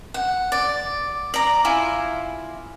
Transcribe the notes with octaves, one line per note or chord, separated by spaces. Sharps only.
F#5
D5
D5 A#5
E4 F4 G#5